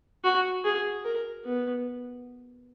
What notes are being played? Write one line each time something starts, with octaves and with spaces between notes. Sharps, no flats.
F#4
G#4
A#4
B3